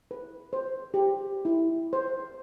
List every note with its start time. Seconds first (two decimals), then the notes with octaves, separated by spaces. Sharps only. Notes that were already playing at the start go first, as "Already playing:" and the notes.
0.11 B4
0.53 C5
0.94 G4
1.45 E4
1.93 C5